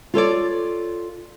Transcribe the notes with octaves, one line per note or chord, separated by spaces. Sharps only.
F4 A4 C#5 D5